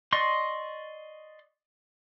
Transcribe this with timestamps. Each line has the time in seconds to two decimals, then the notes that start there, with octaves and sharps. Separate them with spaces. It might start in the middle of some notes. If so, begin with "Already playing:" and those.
0.13 D5 D#5 C6 C#6